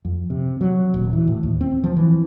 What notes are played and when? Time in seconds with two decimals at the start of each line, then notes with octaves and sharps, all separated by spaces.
0.05 F2
0.30 C3
0.61 F#3
0.94 D#1
1.13 E3
1.27 A2
1.43 D#2
1.61 C4
1.84 F3
1.96 E3